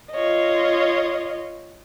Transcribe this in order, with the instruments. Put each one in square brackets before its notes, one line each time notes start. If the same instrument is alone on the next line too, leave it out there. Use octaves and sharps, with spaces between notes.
[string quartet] F4 C#5 D#5